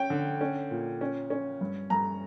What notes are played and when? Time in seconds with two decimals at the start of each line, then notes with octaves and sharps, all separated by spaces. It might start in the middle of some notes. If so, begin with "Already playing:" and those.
Already playing: C#4 G5
0.10 D3
0.41 C#4
0.71 A#2
1.01 C#4
1.30 C#4
1.61 G2
1.90 G2 A#5